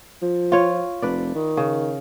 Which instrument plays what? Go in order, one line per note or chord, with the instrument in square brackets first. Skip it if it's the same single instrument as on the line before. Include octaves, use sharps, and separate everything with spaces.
[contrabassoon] F3
[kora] F4 C#5
[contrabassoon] F1 [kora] B4 D5
[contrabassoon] D#3
[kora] C#3